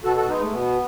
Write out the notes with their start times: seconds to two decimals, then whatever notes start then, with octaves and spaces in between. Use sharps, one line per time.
0.04 B2 F#4 A4
0.16 F#4 A4
0.29 G#3 B3 D#4
0.42 A3
0.53 B2 B3